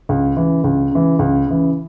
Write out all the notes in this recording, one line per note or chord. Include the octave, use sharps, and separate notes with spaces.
C#2
C#3 E3
C#2
C#3 E3
C#2
C#3 E3